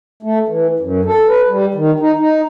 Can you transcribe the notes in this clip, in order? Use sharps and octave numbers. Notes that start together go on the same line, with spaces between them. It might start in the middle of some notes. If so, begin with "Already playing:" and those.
A3
E3
F#2
A4
B4
G3
D#3
D#4
D#4